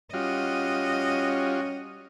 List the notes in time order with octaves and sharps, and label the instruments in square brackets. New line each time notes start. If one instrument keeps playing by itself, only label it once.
[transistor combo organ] G3 F4 F#4 [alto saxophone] C#4 [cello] D#5